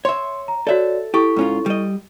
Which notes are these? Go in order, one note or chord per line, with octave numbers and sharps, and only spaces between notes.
C#5 E5 C6
A#5
F#4 A4 C#5 D5 E5
E4 G4 A4 C#6
G#2 C#4 F4
G3 D#5